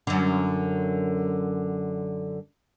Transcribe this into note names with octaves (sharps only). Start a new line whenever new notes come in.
F#2 D3